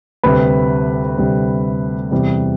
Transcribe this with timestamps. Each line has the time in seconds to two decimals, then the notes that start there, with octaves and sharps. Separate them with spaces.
0.23 D2 C3 G3 B4 B5
1.18 D2 C3 G3
2.11 E2 C3 G3